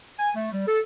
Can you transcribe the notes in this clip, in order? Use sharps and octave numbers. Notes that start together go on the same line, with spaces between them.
G#5
A3
G3
A4